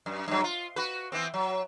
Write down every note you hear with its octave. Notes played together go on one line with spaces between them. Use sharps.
F#2
G2 F#3
F4
F#4 B4
E3 B3 C4
F#3